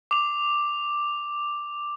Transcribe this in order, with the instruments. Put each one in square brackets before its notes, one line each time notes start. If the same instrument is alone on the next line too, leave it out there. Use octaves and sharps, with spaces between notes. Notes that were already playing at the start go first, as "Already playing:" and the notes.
[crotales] D6 F7